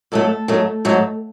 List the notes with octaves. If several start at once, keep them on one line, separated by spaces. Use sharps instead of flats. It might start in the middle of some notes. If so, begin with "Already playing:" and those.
G#2 F#3 A3 A4
G#2 F#3 A3
G#2 F#3 A3